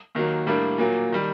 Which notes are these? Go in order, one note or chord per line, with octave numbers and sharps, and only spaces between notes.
D#2 D#3 F#3 A#3
A2 G3 A#3 D4
A#2 F#3 A#3
D#3 G3